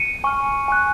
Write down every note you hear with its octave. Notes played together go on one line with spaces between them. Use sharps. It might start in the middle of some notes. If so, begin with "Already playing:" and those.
Already playing: C#7 D#7
G#5 C#6 F6
G#5 C#6 F#6